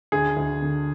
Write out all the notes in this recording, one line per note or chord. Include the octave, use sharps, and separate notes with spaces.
D2 G#4
D2
D3